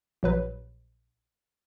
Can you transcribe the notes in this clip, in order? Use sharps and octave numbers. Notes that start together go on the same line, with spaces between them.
A#1 F#3 B4